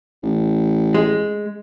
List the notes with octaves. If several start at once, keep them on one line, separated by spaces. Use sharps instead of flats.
A1
G#3